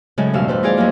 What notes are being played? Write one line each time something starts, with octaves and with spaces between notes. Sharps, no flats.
A2 C#3 F#3 G#3
E2 G2 B2 F5 E6
G3 A3 B4 C5
D#4 F4 G#4 D5 F5
F2 F3 F#3 A#3